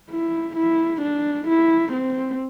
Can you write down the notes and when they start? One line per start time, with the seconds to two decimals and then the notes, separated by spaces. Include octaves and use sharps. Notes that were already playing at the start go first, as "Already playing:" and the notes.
0.11 E4
0.57 E4
1.02 D4
1.48 E4
1.94 C4